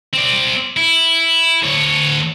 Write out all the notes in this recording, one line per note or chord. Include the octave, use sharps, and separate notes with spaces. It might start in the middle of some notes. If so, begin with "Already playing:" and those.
C4 D5
E4
D2 C#5